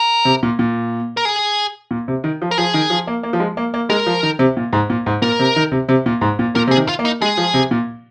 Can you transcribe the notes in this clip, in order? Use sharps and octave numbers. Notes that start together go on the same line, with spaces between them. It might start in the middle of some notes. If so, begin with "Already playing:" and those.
Already playing: A#4
C3
A#2
A#2
A#4
G#4
A#2
C3
D#3
F3
A#4
F3 G#4
D#3
F3
A#3
A#3
F3
G#3
A#3
A#3
G#3 A#4
F3
D#3
C3
A#2
G#2
A#2
G#2
A#2 A#4
C3
D#3
C3
C3
A#2
G#2
A#2
A#2 A#4
C3 G#4
D#3
F4
A#3
D#4
G#3 G#4
F3
C3
A#2